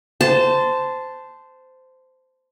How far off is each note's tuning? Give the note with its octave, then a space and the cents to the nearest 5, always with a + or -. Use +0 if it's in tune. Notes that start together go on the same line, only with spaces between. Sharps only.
C5 -15 A5 +0